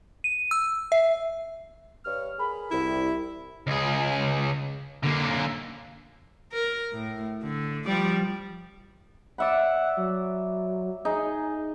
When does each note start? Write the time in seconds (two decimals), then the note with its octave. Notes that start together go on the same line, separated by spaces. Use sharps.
0.24 D#7
0.51 E6
0.92 E5
2.05 G2 C#5 F6
2.38 G#4 A#4 B5
2.71 C2 E4
3.67 C#2 G#4
5.03 D3 A#3
6.52 A#4
6.92 A2
7.43 D3
7.85 F3 G3 D5
9.38 D5 E5 F#5 B5
9.97 F#3
11.05 D#4 G#4